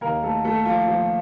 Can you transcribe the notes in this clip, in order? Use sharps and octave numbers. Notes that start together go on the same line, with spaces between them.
D#2 D#3 A#3 A#4
A3 A4
A3 A4
F3 F4
F3 F4